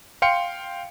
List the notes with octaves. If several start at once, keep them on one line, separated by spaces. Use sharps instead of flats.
F5 G5 C6 C#7